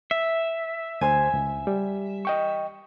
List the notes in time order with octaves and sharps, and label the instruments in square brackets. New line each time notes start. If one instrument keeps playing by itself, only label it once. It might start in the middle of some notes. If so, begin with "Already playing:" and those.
[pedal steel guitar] E5
[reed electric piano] D2 C5 C6 [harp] G#5
[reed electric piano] C#2
G3
D#5 G5 C#6